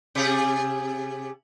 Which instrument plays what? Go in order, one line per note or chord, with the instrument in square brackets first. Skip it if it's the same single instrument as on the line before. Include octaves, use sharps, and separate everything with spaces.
[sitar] C3 G4 G#4